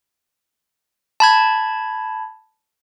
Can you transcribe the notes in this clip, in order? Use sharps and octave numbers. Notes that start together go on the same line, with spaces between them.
A5 B5 G#6